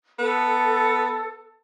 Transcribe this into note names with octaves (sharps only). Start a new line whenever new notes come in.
B3 A4